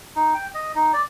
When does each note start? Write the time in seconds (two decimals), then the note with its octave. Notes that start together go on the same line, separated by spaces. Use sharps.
0.16 D#4
0.34 G5
0.54 D#5
0.75 D#4
0.93 D5